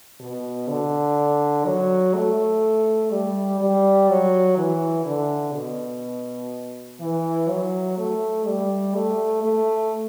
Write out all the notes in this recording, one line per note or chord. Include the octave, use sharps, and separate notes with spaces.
B2
D3
F#3
A3
G3
G3
F#3
E3
D3
B2
E3
F#3
A3
G3
A3
A3